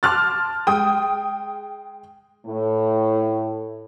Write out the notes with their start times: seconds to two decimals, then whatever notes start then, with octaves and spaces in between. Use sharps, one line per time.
0.03 A5 C6 D6 F6 F#6 A6
0.67 G#3 G5 D#6
2.46 A2